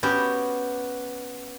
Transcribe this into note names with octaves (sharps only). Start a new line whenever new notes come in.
B3 C#4 F#4 G4